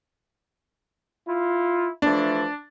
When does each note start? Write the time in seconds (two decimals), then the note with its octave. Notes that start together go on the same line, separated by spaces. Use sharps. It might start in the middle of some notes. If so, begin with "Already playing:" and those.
1.28 E4 F4
2.02 E3 F3 A3 D4